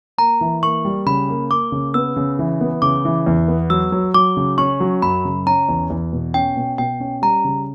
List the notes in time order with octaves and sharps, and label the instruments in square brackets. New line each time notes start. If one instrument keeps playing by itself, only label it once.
[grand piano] A#3 [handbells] A#5
[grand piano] E3
[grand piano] A#3 [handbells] C#6
[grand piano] G3
[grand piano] C#3 [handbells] B5
[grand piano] A#3
[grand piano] A#3 [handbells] D6
[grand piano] C#3
[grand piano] B3 [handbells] E6
[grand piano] C#3
E3
B3
[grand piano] C#3 [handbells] D6
[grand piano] E3
E2
B3
[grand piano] F#3 [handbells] E6
[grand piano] F#3
[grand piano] F#3 [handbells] D6
[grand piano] C#3
[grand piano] C#4 [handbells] C#6
[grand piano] F#3
[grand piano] F#2 [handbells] B5
[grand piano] C#3
[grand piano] C#4 [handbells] A#5
[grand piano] E2
E2
B2
[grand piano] C#4 [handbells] G5
[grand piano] B2
[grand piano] B2 [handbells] G5
[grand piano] C#4
[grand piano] G3 [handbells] A#5
[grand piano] C#3